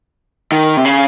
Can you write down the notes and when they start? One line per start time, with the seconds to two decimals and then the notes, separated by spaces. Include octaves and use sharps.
0.52 D#3
0.77 C3
0.85 C#3